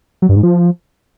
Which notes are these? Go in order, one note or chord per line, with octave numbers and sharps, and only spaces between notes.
F#3
G2
G#2
F3